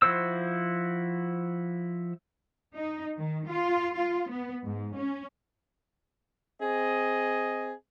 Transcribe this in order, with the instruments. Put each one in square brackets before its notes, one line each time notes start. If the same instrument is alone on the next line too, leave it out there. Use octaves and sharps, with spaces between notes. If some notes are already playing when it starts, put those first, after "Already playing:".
[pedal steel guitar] F3 E4 F#4 C5 E6
[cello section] D#4
D#3
F4
F4
B3
G#2
C#4
[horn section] C4 G#4 D#5